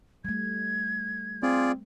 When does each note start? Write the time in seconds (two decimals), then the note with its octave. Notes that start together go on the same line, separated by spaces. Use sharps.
0.25 G3 A3 G#6
1.43 C4 F4 G#4 D5